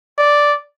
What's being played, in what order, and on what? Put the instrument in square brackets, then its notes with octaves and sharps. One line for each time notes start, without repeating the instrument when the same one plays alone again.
[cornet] D5